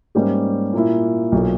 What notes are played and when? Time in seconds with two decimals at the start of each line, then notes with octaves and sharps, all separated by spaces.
0.15 G#2 G3 A#3 C#4 G4
0.73 A#2 A#3 E4
1.32 B1 A#2 A#3